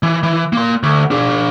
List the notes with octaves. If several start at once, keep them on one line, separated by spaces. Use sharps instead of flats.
E3
E3
A#3 C6
D2
D4 G#4